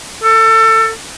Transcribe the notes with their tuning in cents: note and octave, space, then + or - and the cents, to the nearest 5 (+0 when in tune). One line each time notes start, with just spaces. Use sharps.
A4 +25